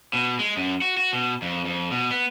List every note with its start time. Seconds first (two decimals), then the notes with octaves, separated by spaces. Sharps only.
0.13 B2
0.39 G#3
0.57 F#2
0.82 F#4
0.97 F#4
1.13 B2
1.42 F2
1.65 F2
1.91 B2
2.11 B3